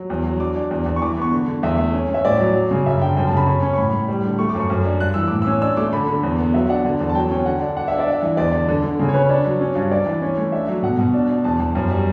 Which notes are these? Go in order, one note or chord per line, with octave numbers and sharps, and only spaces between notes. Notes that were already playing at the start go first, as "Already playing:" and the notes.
Already playing: F#3
E2
F#3
D4 D6
D4
E2
E2
C#6
E3 D6
B3 C#6
D3
D3
E2 E5
A3
C#4
C#4 E5
A2 D5
F#3
F#3
C#3
F#2 E5
D3 G5
F#2 G5
A5
C#3
B5
C#4
C#4
C#6
A2 B5
A2
G3
D3
A3 C#6
D6
F#2
C#6
F#2
D4
G2 F#6
E3 E6
A2 D6
E6
C#4
D4 E6
A3 D6
D3 B5
D3
E2
B3
F#3 E5
D4 F#5
D3
E2
A5
F#3 G5
C#4 G5
D3 F#5
D4
D4 F#5
D4 E5
D5
D4 E5
E3
E2 D5
D3
D3
D3
C#3
C#5
C#4 B4
D4
F#3
C#4
G2
D4 D5
E3
C#4
A3
D4 E5
F#3
B2 F#5
B2
D4
D4
E2 A5
E2
F#2
G3